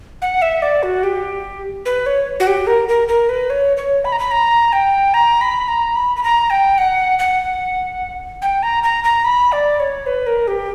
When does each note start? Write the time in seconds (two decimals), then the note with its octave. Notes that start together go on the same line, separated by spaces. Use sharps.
0.22 F#5
0.42 E5
0.62 D5
0.83 F#4
1.03 G4
1.86 B4
2.06 C#5
2.40 F#4
2.47 G4
2.67 A#4
2.89 A#4
3.08 A#4
3.29 B4
3.50 C#5
3.77 C#5
4.05 B5
4.12 A#5
4.19 B5
4.31 A#5
4.73 G5
5.14 A#5
5.41 B5
5.68 A#5
5.95 B5
6.16 B5
6.23 A#5
6.50 G5
6.78 F#5
7.19 F#5
8.42 G5
8.63 A#5
8.84 A#5
9.04 A#5
9.25 B5
9.52 D5
9.80 C#5
10.06 B4
10.27 A#4
10.48 G4